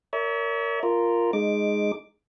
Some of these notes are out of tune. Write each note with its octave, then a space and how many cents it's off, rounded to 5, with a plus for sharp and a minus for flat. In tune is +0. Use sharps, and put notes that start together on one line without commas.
A#4 -10 C#5 +40 E5 -30
F4 -5 A#4 +0
G#3 +0 D#4 -15 D6 +0